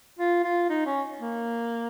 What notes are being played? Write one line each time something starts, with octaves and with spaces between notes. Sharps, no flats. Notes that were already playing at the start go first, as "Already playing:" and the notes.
F4
F4
D#4
C#4
A#3